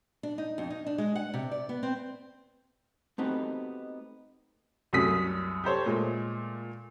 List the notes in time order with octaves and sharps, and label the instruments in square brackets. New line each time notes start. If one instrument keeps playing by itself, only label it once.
[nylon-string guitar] D4
D#4
F2
D#4
D4
G#3
F#5
C3
D5
B3
C4
[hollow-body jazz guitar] A3 B3 C4 D#4 F#4 G4
[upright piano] C2 F#2 A3 D#6 B6
G4 A4 C5 C#5
A#2 G#3 A3